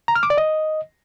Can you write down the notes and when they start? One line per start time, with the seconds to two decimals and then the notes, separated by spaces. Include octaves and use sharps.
0.08 A#5
0.15 F6
0.23 D6
0.30 D5
0.38 D#5